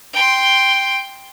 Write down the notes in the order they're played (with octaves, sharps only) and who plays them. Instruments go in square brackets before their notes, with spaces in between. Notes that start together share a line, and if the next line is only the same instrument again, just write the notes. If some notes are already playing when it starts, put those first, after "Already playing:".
[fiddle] G5 C6